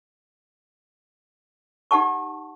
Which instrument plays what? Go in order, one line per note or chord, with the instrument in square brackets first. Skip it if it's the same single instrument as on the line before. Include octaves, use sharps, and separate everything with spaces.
[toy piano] D#4 G4 F#5 A5 C#6